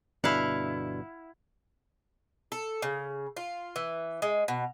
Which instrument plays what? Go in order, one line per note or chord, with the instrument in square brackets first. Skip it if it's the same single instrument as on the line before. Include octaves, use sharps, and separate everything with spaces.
[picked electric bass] G1 B2 D4 [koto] E4 F5 F#5
[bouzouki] A4
C#3
F4
E3
G#3
B2